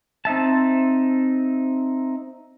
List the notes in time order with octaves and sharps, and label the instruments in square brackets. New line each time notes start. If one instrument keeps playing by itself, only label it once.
[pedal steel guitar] C4 D#4 E5 A5